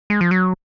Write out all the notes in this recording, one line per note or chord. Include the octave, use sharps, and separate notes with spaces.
G#3
F3
F#3